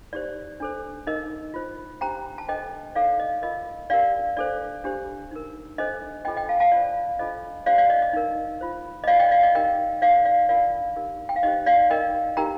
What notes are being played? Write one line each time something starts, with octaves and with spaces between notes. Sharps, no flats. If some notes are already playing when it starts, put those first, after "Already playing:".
D#4 G4 C5 D5
D4 A4 C5
D#4 A#4 D#5
F4 C5
D4 G4 C5 G5 A#5
A5
D4 A4 C5 D#5 G5
D#4 A4 C5 D5 F5
D#5
F4 A#4 D#5
D4 G4 A#4 D5 F5
D4 A4 C5 D5
D4 G4 C5
D#4 A#4
D4 A4 C5 D#5
D4 F4 A4 C5 D#5 G5
D#5 G5
F5 A5
F5 A5
F4 C5 D5
D4 F4 A4 C5 D#5
D4 G4 C5 D5 F5
D5 F5
D#5
D#5
D#4 A#4
F4 C5
D#5
F4 C5 D5 F5
D#5 G5
D5 F5
D#5
D#4 G4 A#4 D#5 G5
D#4 A4 C5 D5 F5
D5 F5
D4 F4 A#4 D5 F5
D#4 G4 A#4
G5
F5
D#4 G4 C5 D#5
D5 F5
D#4 A#4 D#5 G5
D#4 G4 A#4 G5 A#5